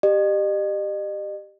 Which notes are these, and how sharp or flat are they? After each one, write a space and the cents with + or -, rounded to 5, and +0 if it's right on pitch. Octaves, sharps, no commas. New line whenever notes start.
G4 +0 D#5 -40